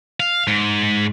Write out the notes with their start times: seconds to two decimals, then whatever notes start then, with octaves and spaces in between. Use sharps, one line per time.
0.20 F5
0.47 G#2